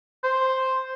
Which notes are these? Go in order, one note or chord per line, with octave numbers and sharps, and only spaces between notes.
C5